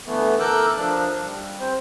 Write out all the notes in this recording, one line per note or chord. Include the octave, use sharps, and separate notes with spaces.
D3 E3 A3 B3
A4 A#4 D6 E6 F#6 G6
F3 D4
G3
C4 C5